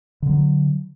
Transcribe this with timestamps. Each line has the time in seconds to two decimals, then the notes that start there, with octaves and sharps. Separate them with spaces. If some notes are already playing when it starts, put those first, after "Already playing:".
0.22 D3
0.26 E3
0.29 F#3